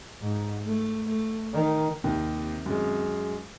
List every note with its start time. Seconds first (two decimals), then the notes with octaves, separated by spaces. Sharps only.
0.22 G#2
0.66 A3
1.08 A3
1.53 D#3
2.04 D#2 C3 D#3
2.66 F#2 G#3